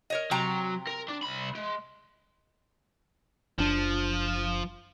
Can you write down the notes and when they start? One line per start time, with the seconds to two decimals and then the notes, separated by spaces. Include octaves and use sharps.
0.10 A#4 C#5 D#5
0.31 C3 F#3 G5 A#5
0.87 A#4
1.09 D4
1.23 C2 B5
1.55 G#3
3.58 F#1 F3 D4